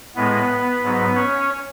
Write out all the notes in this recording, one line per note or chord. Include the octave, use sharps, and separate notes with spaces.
A2 G#3 B3 B4
G#2 F#3
C#4 C#5